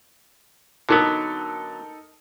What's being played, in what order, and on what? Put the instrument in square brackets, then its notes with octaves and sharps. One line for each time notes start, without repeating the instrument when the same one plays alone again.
[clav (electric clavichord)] D3 F#3 B3 [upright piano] D#4 A4 A#4